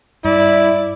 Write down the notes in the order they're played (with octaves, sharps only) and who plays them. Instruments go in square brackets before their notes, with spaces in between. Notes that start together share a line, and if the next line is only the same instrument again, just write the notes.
[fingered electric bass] G2 [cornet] E4 [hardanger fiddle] D5